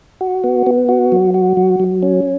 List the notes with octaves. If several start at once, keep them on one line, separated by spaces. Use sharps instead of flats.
F#4
B3
B3
F#4
F#3
F#4
F#3
F#3
C#4